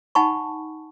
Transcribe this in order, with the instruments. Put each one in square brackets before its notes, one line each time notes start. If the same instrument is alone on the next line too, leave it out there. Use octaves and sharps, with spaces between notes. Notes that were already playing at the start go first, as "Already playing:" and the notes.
[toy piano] D#4 F#5 G#5 A5 B5 C#6